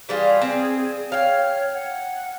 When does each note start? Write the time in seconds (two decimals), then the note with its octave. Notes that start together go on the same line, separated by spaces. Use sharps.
0.09 E3 G3 F4 G#4
0.41 C4
1.12 C#5 F5 G5
1.74 F#5